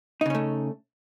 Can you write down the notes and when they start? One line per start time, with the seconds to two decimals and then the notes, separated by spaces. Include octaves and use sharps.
0.21 D#4
0.26 C#3
0.30 C#4
0.35 A3